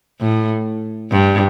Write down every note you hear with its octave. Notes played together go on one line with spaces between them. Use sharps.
A2
G2